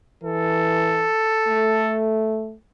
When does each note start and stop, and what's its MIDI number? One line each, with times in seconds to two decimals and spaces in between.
0.23 1.09 52
0.23 2.02 69
1.47 2.55 57